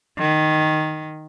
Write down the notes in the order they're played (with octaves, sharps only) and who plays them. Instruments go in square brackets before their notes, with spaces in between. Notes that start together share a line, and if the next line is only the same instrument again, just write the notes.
[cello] D#3